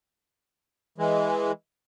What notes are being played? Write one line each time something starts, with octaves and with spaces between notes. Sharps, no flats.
E3 G#3